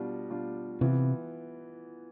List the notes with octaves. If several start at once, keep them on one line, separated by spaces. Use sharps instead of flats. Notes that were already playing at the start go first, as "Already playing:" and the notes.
Already playing: B2 G3 D4 F4
B2 G3 D4 F4
C3 E3 B3 F4